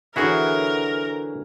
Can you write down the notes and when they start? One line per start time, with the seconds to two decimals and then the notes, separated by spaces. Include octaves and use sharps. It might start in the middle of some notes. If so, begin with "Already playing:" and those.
0.16 D3 E3 F#3 E4 F#4 G#4 A#4